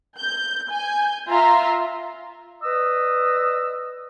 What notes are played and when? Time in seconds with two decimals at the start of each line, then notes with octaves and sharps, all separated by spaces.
0.18 G6
0.70 G#5 G6
1.28 F4 E5 A#5 C6
2.64 B4 D5 D#5 E6